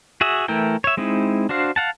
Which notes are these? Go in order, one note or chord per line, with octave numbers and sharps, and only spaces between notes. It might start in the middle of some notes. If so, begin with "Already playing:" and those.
F#4 G#4 E5
E3 A3 E4 A#4 G5
C#5 E5
G#3 C4 D#4 E4
D4 F#4 C5 F5
F5 F#5 A5